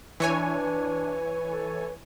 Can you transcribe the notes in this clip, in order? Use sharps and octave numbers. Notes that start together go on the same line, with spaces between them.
E3 D4 C#5 G#5
B4
A4